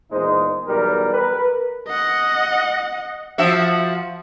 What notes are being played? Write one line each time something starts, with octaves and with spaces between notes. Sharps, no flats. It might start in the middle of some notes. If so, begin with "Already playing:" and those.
E2 A#2 G#3 D#4 C5
B1 E2 G3 A#4
A#4 B4
D#5 F#5
F3 F#4 E5